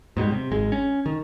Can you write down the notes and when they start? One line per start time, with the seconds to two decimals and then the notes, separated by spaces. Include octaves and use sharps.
0.17 G#2 B2 F#3 G3
0.32 C3
0.52 G#1 G#3
0.72 C#4
1.06 D#3